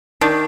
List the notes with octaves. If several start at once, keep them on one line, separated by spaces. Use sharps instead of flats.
D#3 D4